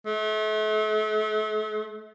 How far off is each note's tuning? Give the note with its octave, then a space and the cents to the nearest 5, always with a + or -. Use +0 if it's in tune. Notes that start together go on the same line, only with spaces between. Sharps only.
A3 -40